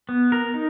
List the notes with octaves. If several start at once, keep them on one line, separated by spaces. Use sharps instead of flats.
B3
A#4
D#4